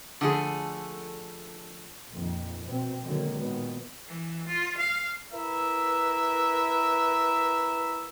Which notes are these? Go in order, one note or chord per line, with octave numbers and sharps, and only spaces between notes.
D3 F3 A3 G#4
A#1 F2 D#3
B2 C4
D3 D#3 F#3 G#3 A#3
A#2 D#3 B3
E3
F4
F5
E4 A#4 B4 E5